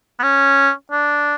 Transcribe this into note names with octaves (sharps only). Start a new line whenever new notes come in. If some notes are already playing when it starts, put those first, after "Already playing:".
B3
C#4
D4